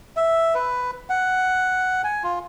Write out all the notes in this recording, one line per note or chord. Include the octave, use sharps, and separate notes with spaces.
E5
B4
F#5
G#5
F4